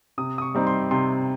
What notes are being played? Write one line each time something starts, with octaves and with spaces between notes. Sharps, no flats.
C3 D#6
D#6
C#6
G3 C4 D#4
C6
C3 C6